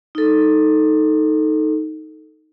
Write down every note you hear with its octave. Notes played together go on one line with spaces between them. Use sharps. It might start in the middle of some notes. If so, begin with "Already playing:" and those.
D#4 A4